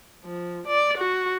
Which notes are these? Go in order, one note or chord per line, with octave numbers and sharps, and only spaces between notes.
F3
D5
F#4